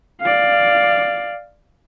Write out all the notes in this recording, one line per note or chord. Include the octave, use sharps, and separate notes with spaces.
D5 F5